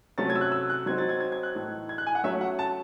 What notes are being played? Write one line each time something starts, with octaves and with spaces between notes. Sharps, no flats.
C3 F#3 A3 C#4 A6
G#6
E6
F#6
E6
F#6
F#3 C4 D#4 G#6
A6
G#6
G#6
G#6
F#6
A2 E3 A3 D#4
G#6
F#6
G#5
F#5
F#3 A3 C#4 E5
F#5
A5